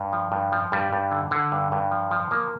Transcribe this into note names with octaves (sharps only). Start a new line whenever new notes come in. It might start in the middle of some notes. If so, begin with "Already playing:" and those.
Already playing: G2
F3
G2
F3
G2 G3
G2
D3
D3
G2
G2
F3
F3
F3 A#3